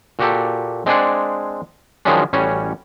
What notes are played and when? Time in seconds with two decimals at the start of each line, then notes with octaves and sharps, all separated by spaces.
0.19 A#2 F#4 G4 A4
0.86 G#3 C4 D4 G#4 D5 F#5
2.05 D#3 F3 F#3 G#3 C#4 D4
2.33 A1 G3 C#4 F#4 C#5